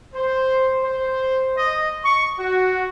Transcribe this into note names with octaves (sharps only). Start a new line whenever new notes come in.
C5
C5
D#5
C#6
F#4